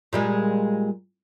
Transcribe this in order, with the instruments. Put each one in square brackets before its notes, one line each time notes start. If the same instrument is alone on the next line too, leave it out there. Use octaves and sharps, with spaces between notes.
[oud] A#2 G3 G#3